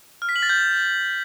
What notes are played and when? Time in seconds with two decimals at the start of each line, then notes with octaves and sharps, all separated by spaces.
0.22 F6
0.29 B6
0.36 F#7
0.43 A6
0.49 G6